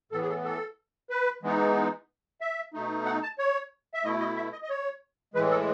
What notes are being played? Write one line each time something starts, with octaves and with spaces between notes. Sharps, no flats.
A2 E3 B3 A4
G#4
A4
A4
B4
E3 G#3 B3 D#4
E5
B2 A3 D#4
F#5
A5
C#5
E5
B2 A3 E4 D#5
D#5
E5
D#5
D#5
C#5
A2 E3 G#3 B4
A4